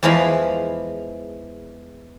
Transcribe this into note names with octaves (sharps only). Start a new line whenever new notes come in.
E2 E3 F3 G#3 F5 B5